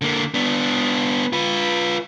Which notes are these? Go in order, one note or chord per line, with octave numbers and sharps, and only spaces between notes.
D3 A#3
B3 D4
F4 B4